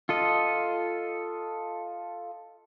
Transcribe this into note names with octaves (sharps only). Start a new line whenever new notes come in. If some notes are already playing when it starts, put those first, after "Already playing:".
F4 A4 D#5